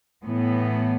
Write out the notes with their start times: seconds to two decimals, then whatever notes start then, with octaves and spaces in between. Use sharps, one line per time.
0.24 A2 E3 B3